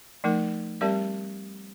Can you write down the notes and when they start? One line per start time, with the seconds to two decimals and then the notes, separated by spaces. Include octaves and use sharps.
0.24 F3 A3 D#4 A#4
0.81 G3 C4 G4 A#4 D5